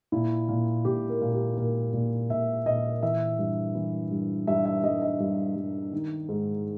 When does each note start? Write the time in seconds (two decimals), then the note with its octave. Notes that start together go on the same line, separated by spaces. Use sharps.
0.12 A#2 E4
0.49 A#2
0.85 A#2 G4
1.09 A#4
1.21 A#2
1.33 G4
1.57 A#2 A#4
1.93 A#2
2.30 A#2 E5
2.66 A#2 D#5
3.03 E3 E5
3.39 G2
3.75 E3
4.11 G2
4.47 G2 E5
4.65 E5
4.84 G2 D#5
5.02 D#5
5.20 G2
5.56 G2
5.92 D#3
6.29 G#2